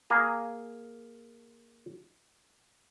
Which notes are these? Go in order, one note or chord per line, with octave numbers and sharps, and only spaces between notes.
A#3 G#4 A#5